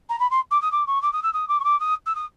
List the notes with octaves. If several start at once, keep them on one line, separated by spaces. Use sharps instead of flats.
A#5
B5
C6
D6
D#6
D6
C#6
D6
D#6
E6
D#6
D6
C#6
D6
D#6
E6
D#6